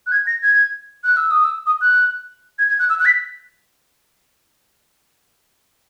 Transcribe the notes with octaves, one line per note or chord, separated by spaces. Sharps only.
F#6
G#6
A#6
G#6
F#6
E6
D#6
E6
D#6
F#6
G#6
G#6
F#6
E6
F#6
B6